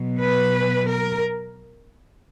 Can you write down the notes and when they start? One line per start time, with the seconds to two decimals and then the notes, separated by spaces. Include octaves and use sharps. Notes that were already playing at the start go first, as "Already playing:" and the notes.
Already playing: B2 F#3
0.21 B4
0.89 A#4